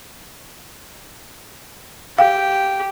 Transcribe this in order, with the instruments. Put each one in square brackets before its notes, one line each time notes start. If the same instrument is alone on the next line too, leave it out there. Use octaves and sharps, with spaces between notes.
[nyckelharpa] G4 [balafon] F5 G5